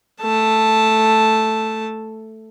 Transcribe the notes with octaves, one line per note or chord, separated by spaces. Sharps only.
A3 A5